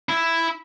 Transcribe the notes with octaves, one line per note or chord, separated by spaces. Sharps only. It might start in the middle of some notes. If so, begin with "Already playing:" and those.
E4